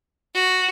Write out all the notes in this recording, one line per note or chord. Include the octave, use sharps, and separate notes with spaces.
F#4